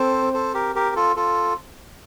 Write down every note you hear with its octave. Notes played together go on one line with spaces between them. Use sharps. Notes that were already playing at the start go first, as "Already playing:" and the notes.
Already playing: C4 A4 C5
A4 C5
G4 A#4
G4 A#4
F4 A4
F4 A4